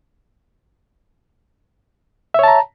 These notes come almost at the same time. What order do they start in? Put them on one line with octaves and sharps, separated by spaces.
E5 C#5 A5 A#5